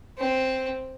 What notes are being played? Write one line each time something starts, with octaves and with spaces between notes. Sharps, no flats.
C4